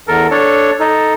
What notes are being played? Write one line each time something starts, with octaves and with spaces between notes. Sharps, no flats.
E2 A4 A#4
D4 A4 C#5
D#4 A4